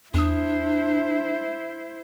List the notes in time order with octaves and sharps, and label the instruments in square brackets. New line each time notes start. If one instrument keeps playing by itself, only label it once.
[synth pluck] E2 D#6 [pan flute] D4 [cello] E4 C5